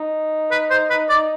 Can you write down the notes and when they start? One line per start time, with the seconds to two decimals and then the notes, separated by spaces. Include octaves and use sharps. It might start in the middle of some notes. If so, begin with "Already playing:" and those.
Already playing: D#4
0.51 B4
0.70 C5
0.90 B4
1.09 D5